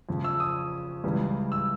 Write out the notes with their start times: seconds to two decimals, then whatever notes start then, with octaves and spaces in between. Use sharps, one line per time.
0.09 F2 C#3 F3
0.24 E6
0.40 D#6
1.04 C#2 C#3 E3 G3
1.52 E6